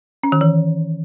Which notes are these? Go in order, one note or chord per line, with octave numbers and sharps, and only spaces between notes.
C#4
D#3
E3